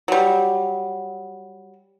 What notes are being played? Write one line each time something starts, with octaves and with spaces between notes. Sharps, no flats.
F#3 G3